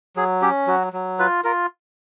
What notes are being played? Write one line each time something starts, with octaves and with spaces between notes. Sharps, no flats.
F#3 G#4
C#4 G4
F#3 F#4
F#3
F4 B4
F4 A#4